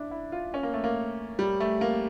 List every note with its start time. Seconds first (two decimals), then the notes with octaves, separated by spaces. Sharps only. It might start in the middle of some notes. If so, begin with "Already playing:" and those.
Already playing: D4 E4
0.11 E4
0.32 F4
0.54 C#4
0.63 A#3
0.74 A3
0.84 A#3
1.39 G3
1.60 A3
1.81 A#3